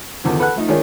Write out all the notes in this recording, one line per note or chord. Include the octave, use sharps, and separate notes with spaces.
E2 D3 D#3 F3
A4 B4 F#5 F#6
F3 A3 D#4
D#3 G#3 C#4 D4 F4 A#4